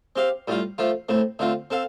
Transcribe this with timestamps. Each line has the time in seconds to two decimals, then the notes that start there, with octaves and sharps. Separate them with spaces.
0.16 C4 G4 F5
0.48 A2 G3 F4
0.78 F3 A3 F4
1.09 A2 A3 C4
1.39 D3 A3 C4 F4
1.71 C4 A4 F5